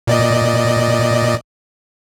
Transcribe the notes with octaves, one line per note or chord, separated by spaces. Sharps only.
A#2 D5 D#5